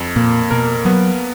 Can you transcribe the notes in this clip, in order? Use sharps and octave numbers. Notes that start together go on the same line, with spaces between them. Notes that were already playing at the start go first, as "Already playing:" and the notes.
Already playing: F2
A#2 A#3
B2 A#4
F#3 B3